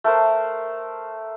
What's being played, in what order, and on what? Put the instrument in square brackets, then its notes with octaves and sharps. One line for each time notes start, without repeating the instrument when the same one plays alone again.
[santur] A3 A#4 C5